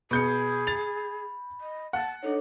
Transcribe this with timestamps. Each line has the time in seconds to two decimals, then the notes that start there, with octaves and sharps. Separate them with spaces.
0.11 B2 G#4 B5 G6 C#7
0.67 A6 F7
1.61 D#5
1.93 F#5 A5
2.23 D4 D#4 A4 C#5